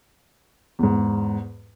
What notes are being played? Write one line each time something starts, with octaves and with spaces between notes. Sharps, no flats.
E2 G#2